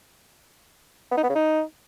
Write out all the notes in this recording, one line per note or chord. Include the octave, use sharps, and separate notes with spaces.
B3
D#4
B3
C#3
D#4